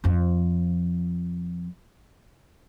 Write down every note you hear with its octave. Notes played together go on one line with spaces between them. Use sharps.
F2 F3